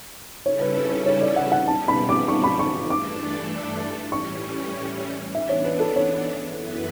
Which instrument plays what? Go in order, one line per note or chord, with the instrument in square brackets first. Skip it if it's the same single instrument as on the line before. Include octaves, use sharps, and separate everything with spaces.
[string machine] C#3 G3 C#4 E4 A4 [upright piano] C#5
[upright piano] B4
B4
C#5
C#5
D5
F#5
F#5
[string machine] B2 G3 B3 [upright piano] A5
[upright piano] B5
D6
C#6
B5
C#6
[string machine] G2 E3 A3 D4 A4 [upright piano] D6
[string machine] A2 E3 G3 C#4 [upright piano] C#6
[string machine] E3 B3 D4 [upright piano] E5
[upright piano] C#5
B4
A4
C#5
[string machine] F#2 E3 B3 E4 B4